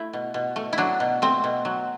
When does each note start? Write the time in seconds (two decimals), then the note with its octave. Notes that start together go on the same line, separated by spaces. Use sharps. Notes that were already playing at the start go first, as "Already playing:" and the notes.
Already playing: A3 E4
0.13 B2
0.34 B2
0.56 A3
0.73 E4
0.78 F#3 D4
1.00 B2
1.22 A3 C4
1.44 B2
1.65 F#3